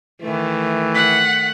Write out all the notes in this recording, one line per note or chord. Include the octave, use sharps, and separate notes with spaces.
D#3 E3 A3
F#5 B6